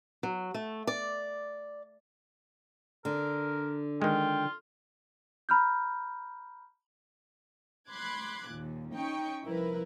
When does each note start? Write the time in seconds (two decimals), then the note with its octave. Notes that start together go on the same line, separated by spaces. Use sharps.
0.23 F#3
0.54 A3
0.87 D5
3.05 D3 A#4
4.02 D#3 G#3 F4 G5
5.49 A#5 B5 F6 G6
7.90 B5 C6 D6 F#6 G#6
8.51 D#2 A#2
8.94 C#4 D#4 G5 C#6
9.43 C2 F3 E4 A#4 B4